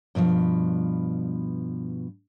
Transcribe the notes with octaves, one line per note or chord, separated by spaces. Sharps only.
G2 B2 D#3 F3